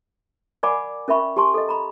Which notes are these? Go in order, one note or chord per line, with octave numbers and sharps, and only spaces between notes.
A#4 D5 F#5 G#5 B5 D6
C#4 A#4 E5 B5 C#6
G4 G#5 A5 C6 C#6
A4 D#5
A#5 B5